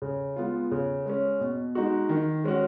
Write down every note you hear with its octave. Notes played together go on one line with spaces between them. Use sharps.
C#3
G#3 B3 F4
C#3
G#3 C#4
B2
G#3 D#4 F#4
D#3
G#3 C#4 F#4